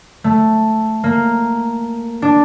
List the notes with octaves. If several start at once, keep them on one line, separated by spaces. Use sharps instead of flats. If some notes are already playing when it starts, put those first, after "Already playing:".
A3
A#3
D4